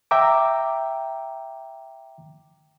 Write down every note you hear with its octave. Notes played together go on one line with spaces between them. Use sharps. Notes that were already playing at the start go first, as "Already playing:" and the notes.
E5 G5 A#5 D6